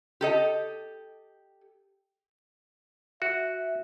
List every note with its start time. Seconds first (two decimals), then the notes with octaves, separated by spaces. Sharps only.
0.21 G4 A4 D#5
3.22 F#4 E5